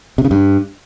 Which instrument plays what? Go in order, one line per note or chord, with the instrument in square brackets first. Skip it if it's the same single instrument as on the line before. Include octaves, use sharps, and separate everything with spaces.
[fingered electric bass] C3
C#3
G2